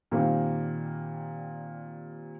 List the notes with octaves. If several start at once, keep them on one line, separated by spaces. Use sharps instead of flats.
A#2 D#3 G3 A#3 C4